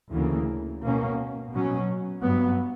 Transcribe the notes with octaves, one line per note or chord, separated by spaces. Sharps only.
D2 C#3 E3 A#3
B2 A#3 C#4
B2 F#3 C#4
G2 F#3 B3